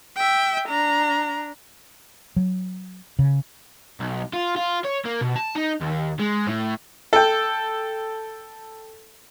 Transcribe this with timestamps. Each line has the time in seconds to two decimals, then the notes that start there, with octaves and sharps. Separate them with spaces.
0.16 E5 G5
0.69 D4 A#5
2.36 F#3
3.19 C#3
4.00 B1
4.33 F4
4.56 F4
4.84 C#5
5.05 A#3
5.21 B2
5.36 A5
5.55 D#4
5.81 D#2
6.19 G#3
6.47 A2
7.13 A4 G5